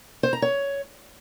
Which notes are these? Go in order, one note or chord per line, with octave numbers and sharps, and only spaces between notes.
C5
A#5
C#5